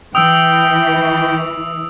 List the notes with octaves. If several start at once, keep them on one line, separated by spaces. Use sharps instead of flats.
E3 G5 D#6 E6 D7